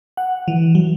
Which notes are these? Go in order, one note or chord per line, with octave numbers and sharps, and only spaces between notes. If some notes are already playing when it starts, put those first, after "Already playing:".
F#5
E3
F#3